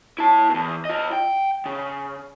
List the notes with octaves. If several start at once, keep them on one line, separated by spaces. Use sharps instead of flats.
E4 A5
E2 B2
F4 D#5
G5
C#3